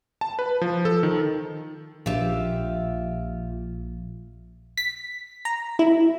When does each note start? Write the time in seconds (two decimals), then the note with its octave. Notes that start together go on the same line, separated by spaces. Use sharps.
0.21 A5
0.39 B4
0.61 F3
0.85 A4
1.03 D#3
2.06 A#1 F4 G4 E5
4.77 B6
5.45 A#5
5.79 E4